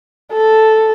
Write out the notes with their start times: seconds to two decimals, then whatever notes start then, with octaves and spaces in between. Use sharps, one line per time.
0.32 A4